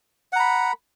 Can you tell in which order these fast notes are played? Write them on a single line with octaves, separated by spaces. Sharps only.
F#5 A#5 B5